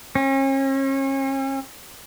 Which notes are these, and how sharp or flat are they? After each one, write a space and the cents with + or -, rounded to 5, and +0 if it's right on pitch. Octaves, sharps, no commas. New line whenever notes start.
C#4 -40